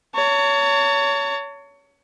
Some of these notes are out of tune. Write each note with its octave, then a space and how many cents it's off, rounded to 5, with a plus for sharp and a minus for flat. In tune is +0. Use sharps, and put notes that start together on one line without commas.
C#5 +25 A5 +45